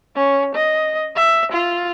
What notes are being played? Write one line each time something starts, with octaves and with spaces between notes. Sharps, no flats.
C#4
D#5
E5
F4